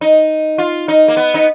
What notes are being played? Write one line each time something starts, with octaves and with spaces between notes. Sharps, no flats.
D#4
F4
D#4
A#3
B3
D#4